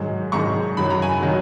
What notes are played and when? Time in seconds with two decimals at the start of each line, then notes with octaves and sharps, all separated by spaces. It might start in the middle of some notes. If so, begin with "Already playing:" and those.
Already playing: G#2 D#3 F#3
0.32 G#2 D#3 F#3 A#5 C#6
0.77 F#2 D#3 F#3 B5
0.90 A#5
1.02 G#5 B5
1.22 D#3 F#3